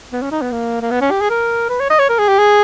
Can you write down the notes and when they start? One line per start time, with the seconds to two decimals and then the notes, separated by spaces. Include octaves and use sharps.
0.13 B3
0.22 C#4
0.31 D#4
0.42 B3
0.52 A#3
0.81 A#3
0.91 B3
1.01 C#4
1.11 G4
1.21 G#4
1.30 A#4
1.69 B4
1.80 C#5
1.90 D#5
1.99 C#5
2.09 A#4
2.18 G#4
2.28 G4
2.39 G#4